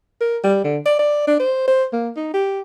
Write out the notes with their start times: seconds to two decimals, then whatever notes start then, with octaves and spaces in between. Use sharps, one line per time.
0.21 A#4
0.44 G3
0.64 D3
0.86 D5
0.99 D5
1.27 D4
1.40 C5
1.67 C5
1.93 A#3
2.16 D#4
2.34 G4